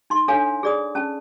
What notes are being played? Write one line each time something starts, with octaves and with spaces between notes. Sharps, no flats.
D#4 C6
D4 A4 C#5 F5 G#5
G#4 D5 D#6
C#4 A5